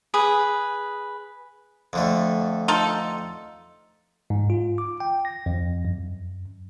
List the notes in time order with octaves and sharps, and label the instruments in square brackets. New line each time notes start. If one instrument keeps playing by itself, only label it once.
[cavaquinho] G#4 B4 D#6
[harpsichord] F2 D3 A3
[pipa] D#4 F4 A4
[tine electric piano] G#2
F4
D6
G5
A#6
F2
F#2